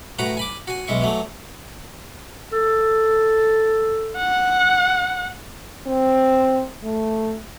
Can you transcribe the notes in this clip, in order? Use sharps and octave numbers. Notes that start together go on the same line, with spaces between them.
A2 F#4 B4 A#5
G#5 B5 D6
F#4 G#5
B1 G#3 E4 C#6
E3 F#3 A3
A4
F#5
C4
A3